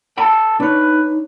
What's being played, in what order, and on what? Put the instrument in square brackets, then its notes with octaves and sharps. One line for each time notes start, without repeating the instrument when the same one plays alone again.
[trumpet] A4 [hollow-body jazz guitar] G5 B5
[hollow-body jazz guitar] D4 C#5 [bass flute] D#4 [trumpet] B4